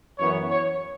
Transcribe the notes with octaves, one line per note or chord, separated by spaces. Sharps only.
F#2 E3 B3 C#5
C#5